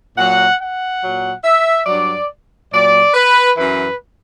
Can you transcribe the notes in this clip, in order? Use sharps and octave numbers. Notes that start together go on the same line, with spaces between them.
A#2 F#3 F#5
F#5
A#2 F#3
E5
G2 F#3 D5
A#2 F#3 D5
B4
F#2 E3 B4